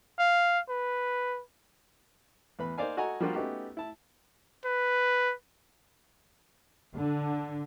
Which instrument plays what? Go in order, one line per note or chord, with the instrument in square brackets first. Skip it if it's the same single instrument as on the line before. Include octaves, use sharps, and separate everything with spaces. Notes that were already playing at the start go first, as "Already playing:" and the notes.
[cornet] F5
B4
[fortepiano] E2 B4 B5
A#3 D#4 C5 D5 F5 G#5
F#4 A4 D#5 F#5 G#5 A#5
F3 G3 A#3 D4 F4 F#4
A3 B3 C#4 D#4 F#4 G4
E4 A5
[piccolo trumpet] B4
[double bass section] D3